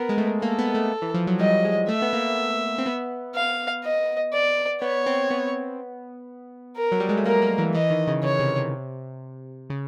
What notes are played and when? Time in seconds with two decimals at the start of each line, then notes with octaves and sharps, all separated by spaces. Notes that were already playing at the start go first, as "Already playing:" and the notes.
Already playing: B3 A#4
0.09 G#3
0.18 A3
0.42 A#3 A4
0.59 B3
0.75 A3
1.02 E3
1.14 F3
1.27 F#3
1.39 G3 D#5
1.65 G#3
1.88 A3 E5
2.02 B3
2.13 A#3
2.78 C4
2.86 B3
3.35 F5
3.85 D#5
4.33 D5
4.81 B3 C#5
5.06 C4
5.30 B3
6.76 A#4
6.92 F#3
7.00 G3
7.09 G#3
7.17 A3
7.26 A#3 A#4
7.42 A#3
7.58 E3
7.75 E3 D#5
7.90 D#3
8.07 C#3
8.23 C#3 C#5
8.39 C3
8.56 C3
9.70 C#3